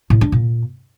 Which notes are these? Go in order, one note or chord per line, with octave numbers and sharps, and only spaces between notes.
A2
D4
A#2